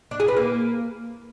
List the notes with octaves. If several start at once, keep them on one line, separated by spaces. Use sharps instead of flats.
D4
G#4
B4
A#3